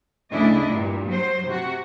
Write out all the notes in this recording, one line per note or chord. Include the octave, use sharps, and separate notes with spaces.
D2 C#3 D4 E4 D#5
G2 A#2
F#3 C5
C3 F#4